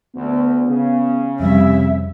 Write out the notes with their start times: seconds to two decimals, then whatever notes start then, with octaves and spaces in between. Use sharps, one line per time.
0.15 D2 B3
0.67 C#3
1.40 F2 C3 G3 E5